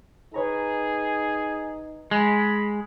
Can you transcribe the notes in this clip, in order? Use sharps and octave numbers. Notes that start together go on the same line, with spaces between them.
D#4 G#4 B4 C#5 A#5
G#3 B5